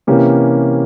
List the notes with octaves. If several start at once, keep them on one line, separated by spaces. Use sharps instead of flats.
C3 E3 A#3 C#4 G4